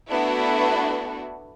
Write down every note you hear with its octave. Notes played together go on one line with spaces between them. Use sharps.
A3 B3 D4 E4 F#4